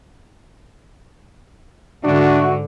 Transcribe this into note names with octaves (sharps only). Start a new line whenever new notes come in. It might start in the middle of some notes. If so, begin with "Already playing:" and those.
G#2 D3 D4 F#4 E5